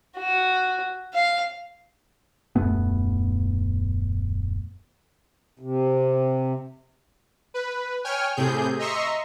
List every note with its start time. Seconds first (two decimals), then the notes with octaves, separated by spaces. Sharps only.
0.16 F#4
1.14 F5
2.56 D#1 F#2 A3 B3
5.59 C3
7.54 B4
8.04 C#5 G5 G#5 F6
8.36 A2 C3 G#4 G6
8.79 D#5 E5 A#5 C6 C#6